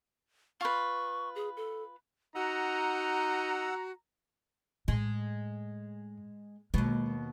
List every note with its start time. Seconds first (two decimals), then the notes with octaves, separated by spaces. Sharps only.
0.61 F4 B4 C#6
1.35 G#4
1.57 A4
2.35 D#4 F#4 F#5 A#5 E6
4.88 A2 G#3
6.74 D#2 B2 G#3